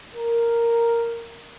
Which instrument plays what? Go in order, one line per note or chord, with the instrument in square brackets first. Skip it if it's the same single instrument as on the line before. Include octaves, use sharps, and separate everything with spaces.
[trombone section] A#4